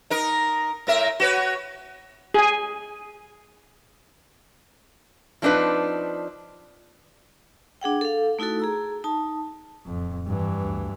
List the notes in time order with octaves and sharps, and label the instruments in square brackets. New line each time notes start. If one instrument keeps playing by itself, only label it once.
[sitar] D#4 A#4
A2 A#4 E5
F#4 B4 C#5
[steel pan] G#4 G#5
[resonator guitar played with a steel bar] F3 C4 D4 D#4 B4
[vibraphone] D4 G#4 F#5 G5
A4 F5
A3 D#4 E4 F#4 A4
G#4 A#5 E6
D#4 A5
[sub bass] D1 [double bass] F2
[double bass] G2 E3
[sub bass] D2